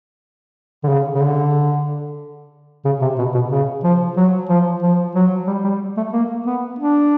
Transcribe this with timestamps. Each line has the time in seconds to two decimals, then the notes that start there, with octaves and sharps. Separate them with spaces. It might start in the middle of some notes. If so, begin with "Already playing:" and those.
0.84 D3
0.89 C#3
1.15 C#3
1.22 D3
2.85 C#3
3.02 C3
3.18 B2
3.34 B2
3.51 C#3
3.84 F3
4.16 F#3
4.49 F3
4.83 F3
5.15 F#3
5.48 G3
5.64 G3
5.97 A3
6.13 A#3
6.46 B3
6.79 D4